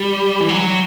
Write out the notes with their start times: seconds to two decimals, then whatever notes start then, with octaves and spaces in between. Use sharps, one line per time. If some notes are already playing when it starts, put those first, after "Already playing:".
Already playing: G3
0.40 E3
0.49 F#3